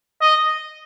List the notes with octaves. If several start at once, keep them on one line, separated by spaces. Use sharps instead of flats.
D#5